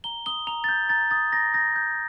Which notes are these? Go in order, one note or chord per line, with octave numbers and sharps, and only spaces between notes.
A#5 G7
D#6 G7
A#5 F7
A6
G6
A#5 A6
D#6 A6
A#5 A#6
G6 A#6
G6